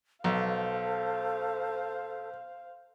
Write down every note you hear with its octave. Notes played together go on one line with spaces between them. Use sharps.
B1 A4 C5 F5